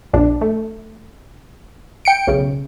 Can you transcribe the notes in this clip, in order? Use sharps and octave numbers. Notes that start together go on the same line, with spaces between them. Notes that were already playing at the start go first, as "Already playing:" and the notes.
A#1 F2 D4
A3
G5 C#7 D7
B1 C#3